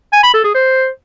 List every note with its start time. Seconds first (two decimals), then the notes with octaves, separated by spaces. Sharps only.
0.13 G#5
0.23 B5
0.34 A4
0.44 G#4
0.55 C5